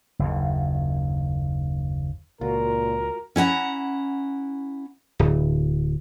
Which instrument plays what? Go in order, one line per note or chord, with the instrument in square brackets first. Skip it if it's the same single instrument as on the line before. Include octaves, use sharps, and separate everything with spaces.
[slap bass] F#1 D#2
[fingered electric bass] C#2 [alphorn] A#2 [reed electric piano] F4 F#4 [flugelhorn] A#4
[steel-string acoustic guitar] C#4 E4 F#5 A#5
[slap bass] D1